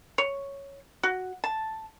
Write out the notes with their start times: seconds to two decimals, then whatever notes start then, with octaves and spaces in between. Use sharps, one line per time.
0.18 C#5
1.03 F#4
1.44 A5